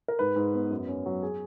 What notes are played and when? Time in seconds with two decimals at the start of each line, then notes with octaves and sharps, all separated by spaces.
0.08 A#4
0.19 G#2 B4
0.36 G#2
0.54 B3
0.71 F#2
0.88 C#4
1.06 F#3
1.23 G#4